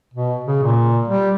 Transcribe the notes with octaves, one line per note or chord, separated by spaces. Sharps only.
B2
C#3
A#2
G3